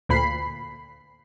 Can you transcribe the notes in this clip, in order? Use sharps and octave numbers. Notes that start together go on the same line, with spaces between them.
D2 A#2 B5 C7